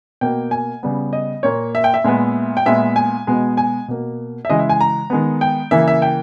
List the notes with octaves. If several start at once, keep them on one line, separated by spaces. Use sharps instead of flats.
B2 A#3 G5
G#5
C#3 G3 B3
D#5
A#2 A#3 C#5
E5
G5
E5
A#2 G#3 B3
G5
A#2 G#3 B3 E5
G#5
B2 G#3 B3
G#5
B2 A#3
E5
C#3 E3 G#3 D#5
E5
G#5
A#5
D#3 G#3 B3
G5
C#3 E3 A#3 E5
E5
G5